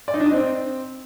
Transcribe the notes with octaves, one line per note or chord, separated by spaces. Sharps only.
D5
D#4
D4
D#5
C4